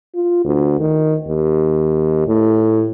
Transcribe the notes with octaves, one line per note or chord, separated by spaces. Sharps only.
F4
D2
D#3
D#2
A2